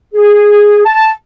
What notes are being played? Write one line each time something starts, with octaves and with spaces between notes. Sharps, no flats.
G#4
A5